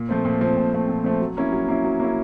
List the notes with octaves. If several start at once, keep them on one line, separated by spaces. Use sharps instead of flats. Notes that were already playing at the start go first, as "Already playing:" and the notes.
Already playing: A#2
F3 A3 C4
A#2
F3 A3 C4
A#2
F3 A3 C4
A#2
F3 A3 C4
F#3
A#3 C#4 E4
F#3
A#3 C#4 E4
F#3
A#3 C#4 E4